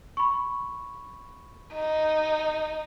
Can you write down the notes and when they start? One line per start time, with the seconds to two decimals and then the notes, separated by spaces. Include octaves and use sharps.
0.17 B5 C#6
1.74 D#4